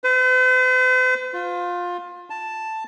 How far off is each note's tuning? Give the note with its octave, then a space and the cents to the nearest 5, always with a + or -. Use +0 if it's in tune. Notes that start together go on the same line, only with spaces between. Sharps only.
C5 -45
F4 +20
A5 +5